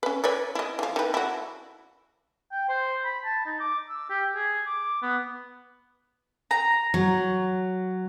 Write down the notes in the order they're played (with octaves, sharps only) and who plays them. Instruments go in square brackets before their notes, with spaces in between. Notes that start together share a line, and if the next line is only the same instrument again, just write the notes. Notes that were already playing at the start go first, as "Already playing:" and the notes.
[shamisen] C#4 B4
B4 C#5 D5
E4 D#5
E3 F3
D#3 B4
E4 F#4
[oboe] G5
C5
B5
A5
D#4
D6
E6
G4
G#4
D6
B3
[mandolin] A#5
[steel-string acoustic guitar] F#3